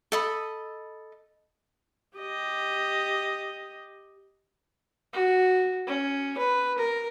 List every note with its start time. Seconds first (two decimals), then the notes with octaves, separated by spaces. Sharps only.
0.12 A4 D#5 B5
2.18 G4 D#5
5.13 F#4
5.87 C#4
6.38 B4
6.78 A#4